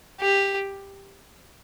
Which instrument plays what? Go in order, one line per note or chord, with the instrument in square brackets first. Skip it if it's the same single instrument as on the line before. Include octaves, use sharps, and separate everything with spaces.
[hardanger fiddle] G4